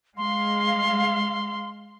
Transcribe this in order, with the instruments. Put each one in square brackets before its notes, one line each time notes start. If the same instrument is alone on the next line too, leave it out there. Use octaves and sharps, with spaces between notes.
[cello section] G#3 F5 [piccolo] C6